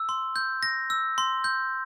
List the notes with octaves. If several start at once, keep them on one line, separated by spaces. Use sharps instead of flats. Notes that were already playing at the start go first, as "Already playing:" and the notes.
Already playing: E6
C6
G6
A#6
E6
C6
G6